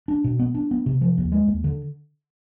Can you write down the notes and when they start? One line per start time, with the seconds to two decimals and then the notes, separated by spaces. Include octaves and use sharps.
0.08 D4
0.24 B2
0.39 B3
0.55 D4
0.71 B3
0.86 C3
1.01 F3
1.18 D#2
1.32 G#3
1.47 D#2
1.64 D3